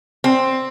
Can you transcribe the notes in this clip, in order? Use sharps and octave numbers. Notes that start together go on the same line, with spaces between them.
C4